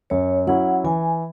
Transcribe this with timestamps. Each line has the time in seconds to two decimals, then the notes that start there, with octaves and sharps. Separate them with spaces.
0.10 F#2 C#5
0.47 F#3 C#4 E4 F#5
0.84 E3 G#5